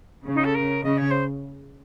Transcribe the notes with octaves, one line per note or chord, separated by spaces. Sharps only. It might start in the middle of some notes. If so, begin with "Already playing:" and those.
C#3
D#4
A4
A#4
C#3 D#5
C#5
C5